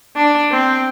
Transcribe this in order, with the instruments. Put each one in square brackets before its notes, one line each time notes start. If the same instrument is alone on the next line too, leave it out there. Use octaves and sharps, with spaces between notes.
[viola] D4
C4